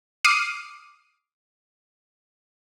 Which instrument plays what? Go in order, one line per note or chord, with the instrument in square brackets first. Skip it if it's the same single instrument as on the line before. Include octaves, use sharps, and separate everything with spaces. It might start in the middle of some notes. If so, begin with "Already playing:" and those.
[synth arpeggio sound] D6 D#6 F6 C7 D#7